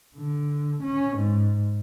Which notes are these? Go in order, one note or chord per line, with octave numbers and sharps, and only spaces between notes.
D3
C#4
G#2